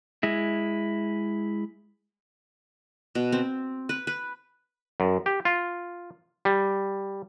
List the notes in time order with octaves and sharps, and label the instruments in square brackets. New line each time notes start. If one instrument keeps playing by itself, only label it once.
[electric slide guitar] G#3 E4
[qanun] B2
C4
B4
B4
[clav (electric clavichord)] F#2
G4
F4
G3